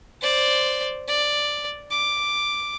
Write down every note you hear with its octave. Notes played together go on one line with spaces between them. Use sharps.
C5 D5
D5
D6